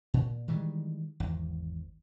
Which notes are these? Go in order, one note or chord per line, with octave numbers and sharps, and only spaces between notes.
A#2
D#3 E3 G3 G#3
G#1 E2